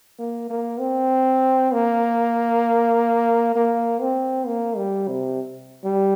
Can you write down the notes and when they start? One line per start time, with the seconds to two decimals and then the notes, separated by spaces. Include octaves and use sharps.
0.18 A#3
0.50 A#3
0.79 C4
1.72 A#3
3.55 A#3
4.01 C4
4.46 A#3
4.77 G3
5.08 C3
5.84 G3